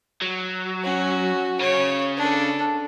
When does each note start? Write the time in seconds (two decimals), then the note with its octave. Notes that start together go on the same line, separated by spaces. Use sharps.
0.22 F#3
0.83 C#4 F#4
1.60 C#3 C#5
2.17 D4 A4